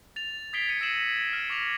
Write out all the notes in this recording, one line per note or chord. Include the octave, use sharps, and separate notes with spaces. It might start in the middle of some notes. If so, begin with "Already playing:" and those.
A6 F7
D#6 G#6 B6 C7 D7 G7
G#6 C#7 D#7 F7
E6 A#6 C7 C#7 E7 F#7
F6
C#6 D6 A#6 F7